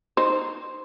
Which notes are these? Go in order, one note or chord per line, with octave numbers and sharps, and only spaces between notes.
D#4 C5